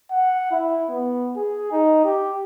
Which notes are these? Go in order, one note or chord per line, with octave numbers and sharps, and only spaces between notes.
F#5
E4
B3
G#4
D#4
G4